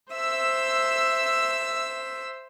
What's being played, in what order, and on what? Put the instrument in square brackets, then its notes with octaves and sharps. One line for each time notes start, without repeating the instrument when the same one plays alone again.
[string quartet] C5 E5 E6